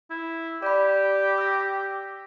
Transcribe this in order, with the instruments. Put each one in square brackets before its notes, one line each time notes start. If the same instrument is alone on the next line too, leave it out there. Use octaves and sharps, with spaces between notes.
[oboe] E4
[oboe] G4 [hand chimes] D5 B5
[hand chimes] E6 A#6